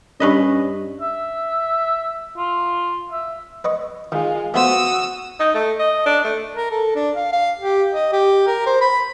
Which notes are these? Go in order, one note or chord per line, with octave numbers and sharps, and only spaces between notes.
G2 C#4 B4 D#5
E5
F4
E5
B4 D#5 C#6
D#3 G#3 F4
A3 B3 F#4 C5 D#6 E6
D#4
A3
D#5
D4
A3
A#4
A4
D4
F5
F5
G4
D#5
G4
A#4
C5
B5